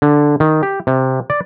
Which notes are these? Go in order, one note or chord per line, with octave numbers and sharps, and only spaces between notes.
D3
D#3
G4
C3
D5